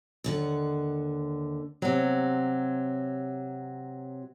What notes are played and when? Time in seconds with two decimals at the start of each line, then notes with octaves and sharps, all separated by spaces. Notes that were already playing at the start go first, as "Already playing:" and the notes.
0.24 D#2 D3 F#5
1.82 C3 F#3